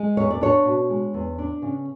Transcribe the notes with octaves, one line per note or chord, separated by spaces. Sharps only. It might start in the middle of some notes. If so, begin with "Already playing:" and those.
Already playing: G#3
E2 C#5
D5
D4 C#5
B2
G#3
E2
D4
C#3